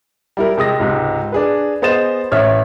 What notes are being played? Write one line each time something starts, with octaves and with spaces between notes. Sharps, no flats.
G3 E4 A#4
C3 G#3 D#6 A#6
C#2 G#2 C3
D4 G#4 B4
B3 G#4 C5 D#5 A6 E7
A1 C#4 C#5 E5 F6